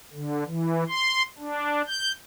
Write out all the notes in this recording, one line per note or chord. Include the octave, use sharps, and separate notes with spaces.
D3
E3
C6
D4
G6